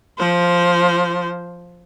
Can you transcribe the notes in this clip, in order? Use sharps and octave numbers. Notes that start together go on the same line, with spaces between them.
F3 C5